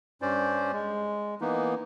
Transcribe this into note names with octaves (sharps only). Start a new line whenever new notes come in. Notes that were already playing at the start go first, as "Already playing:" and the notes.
G2 C#4 C5 D5
G#3
E3 A#3 B3 D#4